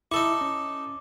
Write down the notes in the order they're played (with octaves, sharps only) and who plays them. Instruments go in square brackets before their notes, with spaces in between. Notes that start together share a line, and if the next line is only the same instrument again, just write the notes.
[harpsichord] D#4 A4 C#6 [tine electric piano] E4 [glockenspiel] D6
[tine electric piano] C#4